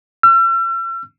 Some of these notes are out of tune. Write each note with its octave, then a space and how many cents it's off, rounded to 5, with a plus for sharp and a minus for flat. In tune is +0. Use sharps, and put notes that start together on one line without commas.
E6 +45